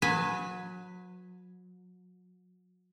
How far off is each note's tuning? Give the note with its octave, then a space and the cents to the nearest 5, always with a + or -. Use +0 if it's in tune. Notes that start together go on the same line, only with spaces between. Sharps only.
F#3 -35 B4 +0 G#5 +0